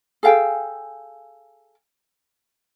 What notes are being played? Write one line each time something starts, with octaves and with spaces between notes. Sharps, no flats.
G#4 A4 F5 G5